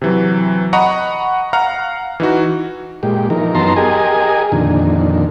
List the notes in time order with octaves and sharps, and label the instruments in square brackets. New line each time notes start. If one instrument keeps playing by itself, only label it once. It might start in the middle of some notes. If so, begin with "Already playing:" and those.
[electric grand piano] C3 E3 F#3
D#5 F#5 A#5 B5 C#6
F5 F#5 A#5 F6
E3 D#4 F#4
[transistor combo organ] A#2 G#3 G4
E3 F3 D#4 A#4
F#2 B3 D#4 A5 A#5 C6
G4 G#4 A#4 D#5 G#5
F2 A#2 D3 D#3